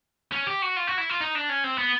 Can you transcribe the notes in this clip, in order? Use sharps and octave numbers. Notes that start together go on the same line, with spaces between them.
C#4
G4
F#4
F4
F#4
E4
F4
D#4
D4
C#4
C4
B3